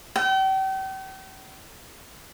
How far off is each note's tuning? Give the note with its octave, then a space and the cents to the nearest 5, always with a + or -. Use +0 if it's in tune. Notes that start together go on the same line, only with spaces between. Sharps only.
G5 -40